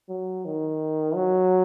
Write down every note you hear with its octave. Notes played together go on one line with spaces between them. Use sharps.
F#3
D#3
F#3